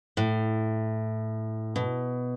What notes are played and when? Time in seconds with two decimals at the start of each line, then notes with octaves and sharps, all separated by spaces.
0.17 A2
1.76 B2